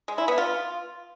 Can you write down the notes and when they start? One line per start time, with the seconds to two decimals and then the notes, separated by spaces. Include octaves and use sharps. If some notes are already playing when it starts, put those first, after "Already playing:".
0.08 G#3
0.18 E4
0.28 B3
0.38 F4